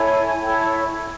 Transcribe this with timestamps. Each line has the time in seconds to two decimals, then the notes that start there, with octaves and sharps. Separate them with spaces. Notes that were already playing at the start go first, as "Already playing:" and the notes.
Already playing: E4 A4 C#5 G#5
0.40 E4 A4 C#5 G5